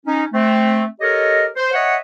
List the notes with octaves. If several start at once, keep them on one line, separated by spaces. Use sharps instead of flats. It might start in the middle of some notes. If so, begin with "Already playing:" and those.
C#4 D#4
A3 C4
G4 A4 A#4 C#5 D#5
C5
C#5 D#5 E5 F#5